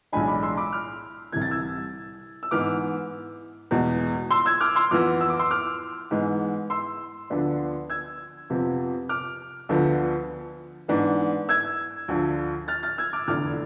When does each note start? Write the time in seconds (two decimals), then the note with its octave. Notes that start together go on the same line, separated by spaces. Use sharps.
0.12 B1 A2 E3 G#3 D4 G#5 B5
0.28 B5 D6
0.43 C6 E6
0.57 B5 D6
0.72 D6 F6
1.32 C2 C3 E3 G#6
1.42 A6
1.51 E6 G#6
2.43 E6
2.51 G#2 E3 B3 D6 F6
3.71 E2 B2 G#3
4.31 C6 E6
4.46 E6 G#6
4.61 D6 F6
4.75 C6 E6
4.91 F2 E3 B3 D6 F6
5.21 E6
5.30 D6
5.39 C6 E6
5.51 D6 F6
6.11 G#2 E3 G#3 B3
6.70 C6 E6
7.30 D2 D3 F3 B3 D4
7.90 E6 G#6
8.50 F2 C3 F3 B3
9.09 D6 F6
9.69 D2 D3 F3 B3
10.88 G#2 E3 B3 D4
11.49 E6 G#6
12.08 D2 D3 F3
12.68 F6 A6
12.83 F6 A6
12.98 E6 G#6
13.13 D6 F6
13.28 F1 E2 D3 D6 F6